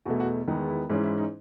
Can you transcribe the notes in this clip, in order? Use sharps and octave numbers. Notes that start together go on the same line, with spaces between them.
E2 B2 A3 F#4
F#4
E2 D#3 G#3 B3 D#4
E4
G#2 E3 G#3 C#4 D#4
E4
D#4